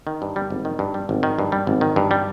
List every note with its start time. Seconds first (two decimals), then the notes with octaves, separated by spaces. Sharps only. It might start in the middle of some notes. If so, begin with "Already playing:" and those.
0.07 D#3
0.22 G2
0.36 G3
0.50 G#1
0.65 D#3
0.79 G2
0.94 G3
1.09 G#1
1.23 D#3
1.39 G2
1.52 G3
1.67 G#1
1.81 D#3
1.96 G2
2.11 G3